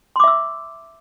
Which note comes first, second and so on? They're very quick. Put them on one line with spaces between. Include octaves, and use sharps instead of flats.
C6 D6 E5 E6